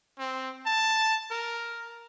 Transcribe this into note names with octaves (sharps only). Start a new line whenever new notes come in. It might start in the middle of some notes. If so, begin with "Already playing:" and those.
C4
A5
A#4